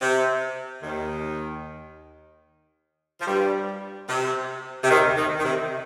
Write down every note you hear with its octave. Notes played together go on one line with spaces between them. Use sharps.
C3
D#2 D#3
F3
G2 G3
C3
C3
D#2 D#3
D#2 D#3
D#3
C3